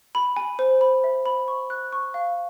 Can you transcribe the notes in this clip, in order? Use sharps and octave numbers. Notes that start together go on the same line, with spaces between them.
B5
G#5
C5
B5
E5
B5
C#6
F#6
C#6
F5